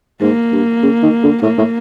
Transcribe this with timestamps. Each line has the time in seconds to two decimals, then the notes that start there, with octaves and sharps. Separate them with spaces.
0.21 G#2 A#3
0.52 G2
0.83 C#3
1.02 D#3
1.23 D3
1.43 A2 A#3
1.58 A2